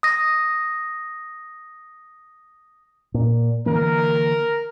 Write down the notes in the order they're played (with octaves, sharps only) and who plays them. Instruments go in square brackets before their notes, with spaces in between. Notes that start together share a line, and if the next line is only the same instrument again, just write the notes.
[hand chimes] D#6 A#6
[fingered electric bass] A#2
[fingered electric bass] D3 E3 A#3 [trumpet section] A#4